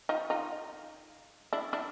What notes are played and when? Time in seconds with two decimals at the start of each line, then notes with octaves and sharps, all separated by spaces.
0.09 D#4 F4
0.30 D#4 F4
1.53 D4 E4
1.73 D4 E4